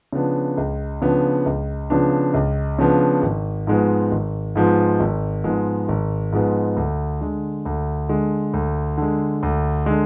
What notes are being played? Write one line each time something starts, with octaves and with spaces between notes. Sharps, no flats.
C#3 F3 B3 D4
C#2
C#3 F3 B3 D4
C#2
C#3 F3 B3 D4
C#2
C#3 F3 B3 D4
G#1
G#2 F3 G#3 B3
G#1
G#2 F3 G#3 B3
G#1
G#2 F3 G#3 B3
G#1
G#2 F3 G#3 B3
D2
D3 G#3
D2
D3 G#3
D2
D3 G#3
D2
D3 G#3